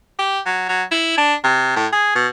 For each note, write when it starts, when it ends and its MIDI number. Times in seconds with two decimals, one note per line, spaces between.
0.19 0.40 67
0.46 0.64 54
0.69 0.83 54
0.91 1.14 64
1.17 1.35 62
1.44 1.73 48
1.76 1.87 45
1.93 2.13 68
2.15 2.28 47